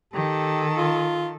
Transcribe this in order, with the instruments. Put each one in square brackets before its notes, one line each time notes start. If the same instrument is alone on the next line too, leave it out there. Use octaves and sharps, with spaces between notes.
[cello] D#3 A4 [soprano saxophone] G4
[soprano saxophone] F4